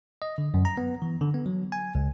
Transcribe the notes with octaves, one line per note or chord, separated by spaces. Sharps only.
D#5
D3
F#2
A#5
B3
E3
D3
B3
F#3
G#5
C#2